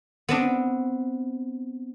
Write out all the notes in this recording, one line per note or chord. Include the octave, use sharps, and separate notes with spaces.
B3 C4 D4